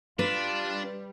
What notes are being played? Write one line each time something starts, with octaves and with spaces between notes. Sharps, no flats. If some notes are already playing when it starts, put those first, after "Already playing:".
G3 D4 F4 B4